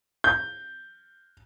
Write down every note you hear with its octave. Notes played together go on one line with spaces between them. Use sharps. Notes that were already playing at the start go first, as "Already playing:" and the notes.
G6